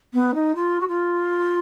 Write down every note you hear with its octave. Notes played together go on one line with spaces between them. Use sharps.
B3
D#4
F4
F#4
F4